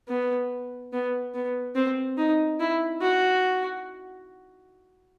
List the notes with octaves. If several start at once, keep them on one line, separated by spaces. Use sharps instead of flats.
B3
B3
B3
C4
D#4
E4
F#4